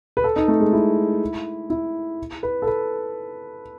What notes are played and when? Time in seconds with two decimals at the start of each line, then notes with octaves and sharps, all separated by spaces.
0.17 B4
0.24 A4
0.36 D#4
0.48 A3
0.60 G#3
0.73 E4
1.70 E4
2.43 B4
2.62 A4
2.67 B4